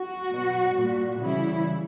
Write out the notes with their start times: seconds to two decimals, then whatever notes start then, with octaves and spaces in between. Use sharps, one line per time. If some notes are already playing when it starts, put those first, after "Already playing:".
Already playing: F#4
0.29 B2 F#3
0.76 A#2 G3
1.22 C#3 E3 G3 E4